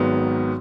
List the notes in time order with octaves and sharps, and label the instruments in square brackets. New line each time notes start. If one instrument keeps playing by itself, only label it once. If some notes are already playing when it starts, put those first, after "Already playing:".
Already playing: [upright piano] G#1 G#2 D#3 F#3 B3